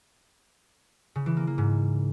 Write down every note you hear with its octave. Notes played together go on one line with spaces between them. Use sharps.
C#3
E3
A#3
A#3
G#2